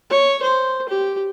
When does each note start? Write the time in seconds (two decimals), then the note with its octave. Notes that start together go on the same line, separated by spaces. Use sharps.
0.10 C#5
0.42 C5
0.89 G4